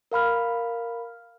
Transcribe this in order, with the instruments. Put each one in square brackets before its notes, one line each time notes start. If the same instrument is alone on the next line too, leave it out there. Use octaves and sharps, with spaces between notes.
[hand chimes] A#4 F5 B5 F6